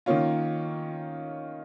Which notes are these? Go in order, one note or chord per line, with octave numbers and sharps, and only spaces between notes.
D#3 A#3 C#4 F4